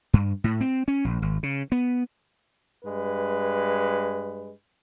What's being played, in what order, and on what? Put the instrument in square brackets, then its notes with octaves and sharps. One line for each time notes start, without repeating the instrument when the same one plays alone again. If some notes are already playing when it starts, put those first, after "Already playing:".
[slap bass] G2
A2
C4
C#4
A#1
G#1
C#3
B3
[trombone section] G2 G#3 B4